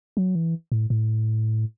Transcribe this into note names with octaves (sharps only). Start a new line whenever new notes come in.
F#3
E3
A2
A2